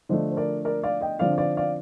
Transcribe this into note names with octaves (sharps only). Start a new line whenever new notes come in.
D3 F3 A3 D4 C5 D#5
C5
A#4 D5
A#4 D5
D5 F5
D#5 G5
D3 F3 C4 D5 F5
D5 F5
D5 F5